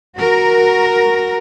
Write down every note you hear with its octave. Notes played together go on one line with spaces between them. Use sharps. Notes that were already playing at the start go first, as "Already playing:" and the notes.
F#4 A#4